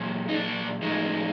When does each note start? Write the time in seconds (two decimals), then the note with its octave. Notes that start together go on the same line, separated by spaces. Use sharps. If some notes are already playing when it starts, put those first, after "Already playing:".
Already playing: A#2 F#3
0.29 D#4
0.34 D4
0.82 A2 F3 G#3 D#4